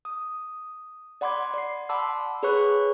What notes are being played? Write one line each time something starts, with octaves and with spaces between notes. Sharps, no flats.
D#6
D5 F#5 B5 C6 D6 G#6
D5 C7
F#5 A5 B5 C6 D6 E6
G#4 B4 C#5 B5 C#6 F#6